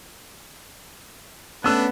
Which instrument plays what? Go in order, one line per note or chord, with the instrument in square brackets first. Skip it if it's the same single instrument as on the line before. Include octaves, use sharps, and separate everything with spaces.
[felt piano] A3 E6 D#7 [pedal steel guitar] B3 [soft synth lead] C#4 [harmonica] D4 B4